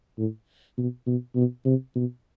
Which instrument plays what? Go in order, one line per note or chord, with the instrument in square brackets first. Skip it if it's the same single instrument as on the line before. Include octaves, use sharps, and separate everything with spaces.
[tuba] A2
B2
B2
B2
C3
B2